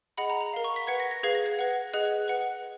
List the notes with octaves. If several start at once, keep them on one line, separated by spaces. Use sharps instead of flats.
G#4 D#5 F#5 B5
A#5
A#5
A#4 F5
C#6
B6
B4 F#5 G#6
A#6
A#6
G#4 B4 F5 G#6
A#6
G#6
B4 F#5
G#4 D#5 F#5 F#6
B4 F#5